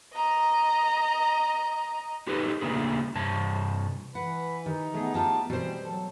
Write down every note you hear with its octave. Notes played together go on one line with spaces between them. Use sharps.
D#5 A#5
D#4 F#4 G4 A4 B4
C#3 A3 A#3 D4 G#4
G2 C3 A5
E3 B4 F#5
D#3 D#4 G4
A3 B3 G#4
D#4 F4 G4 A5
B2 E3 G3 C4 C5
F#3 A4